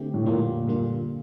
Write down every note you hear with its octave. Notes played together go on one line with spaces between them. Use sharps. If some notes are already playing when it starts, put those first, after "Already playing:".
Already playing: D3 A3 C4 G4
A2
F2 A#2 D3 G3 A#3
G2 D3 G3 A#3 F4